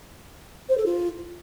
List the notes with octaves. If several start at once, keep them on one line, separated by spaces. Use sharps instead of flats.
C5
A4
F4